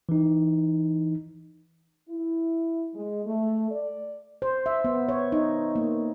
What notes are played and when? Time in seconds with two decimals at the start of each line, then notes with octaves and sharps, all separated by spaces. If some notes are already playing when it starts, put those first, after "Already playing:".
0.09 E3 D#4
2.09 E4
2.94 G#3
3.26 A3
3.72 D5
4.42 C5
4.66 E5
4.85 B3
5.09 C#5
5.32 D#4
5.76 A#3